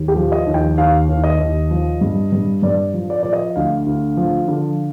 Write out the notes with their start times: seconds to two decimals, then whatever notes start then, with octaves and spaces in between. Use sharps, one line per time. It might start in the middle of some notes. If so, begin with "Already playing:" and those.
Already playing: D#2
0.08 G4
0.16 F3
0.32 D#5
0.47 D#2
0.54 G5
0.78 D#2 F5
1.09 D#2
1.24 D#5
1.40 D#2
1.71 F3
2.01 G2
2.32 G2
2.63 G2 D5
2.94 F3
3.10 D5
3.23 F3 D5
3.33 D#5
3.56 D2 F5
3.86 D2
4.17 F3
4.48 D3